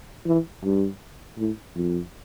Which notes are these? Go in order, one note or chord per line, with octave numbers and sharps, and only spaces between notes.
E3
G2
A2
F2